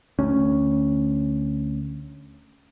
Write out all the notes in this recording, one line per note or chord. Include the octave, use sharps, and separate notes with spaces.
D2 C#4